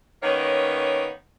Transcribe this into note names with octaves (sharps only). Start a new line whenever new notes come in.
D#3 A#3 B3 C#4 C#5